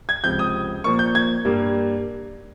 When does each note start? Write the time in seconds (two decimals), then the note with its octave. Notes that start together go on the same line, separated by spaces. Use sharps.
0.09 G#6
0.24 C#2 C3 F3 G6
0.39 D#6
0.84 A#2 F3 A#3 C#6
0.99 G6
1.15 G#6
1.45 G2 G3 A#3